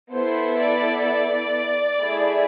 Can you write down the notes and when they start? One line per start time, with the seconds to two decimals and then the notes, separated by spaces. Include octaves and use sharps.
0.13 B3 E4 A4 C5
0.59 D5
1.06 D5
1.98 A3 E4 G#4